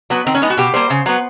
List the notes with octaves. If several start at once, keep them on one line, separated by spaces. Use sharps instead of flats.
F#3 B3
D#3 C4
C#4
G#3 B3 D#4
F#4
B2 G4
G3 A#3 C5
C#3
F#3 B3